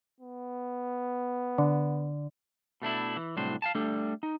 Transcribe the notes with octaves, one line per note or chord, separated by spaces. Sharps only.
B3
D3
B2 A3 D4 E4
E3
C2 A2 F#3 D4 C5
F5 G#5 A5
G3 A3 D4 A4
D#4